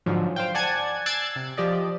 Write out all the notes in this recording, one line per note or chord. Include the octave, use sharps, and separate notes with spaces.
G#2 D3 F3 F#3
C5 F5 G5
D5 F#5 G#5 A5 G#6
E6 F#6 G#6 A6 C7 D7
C3
F3 G4 D5 D#5